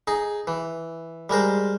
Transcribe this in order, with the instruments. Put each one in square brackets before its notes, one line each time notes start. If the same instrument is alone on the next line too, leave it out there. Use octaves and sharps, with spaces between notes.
[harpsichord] D#4 G#4
E3
G3 G#3 A#4 C5